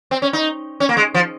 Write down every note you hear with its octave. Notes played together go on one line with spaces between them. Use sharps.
C4
C#4
D#4
C#4
A#3
G#3
F3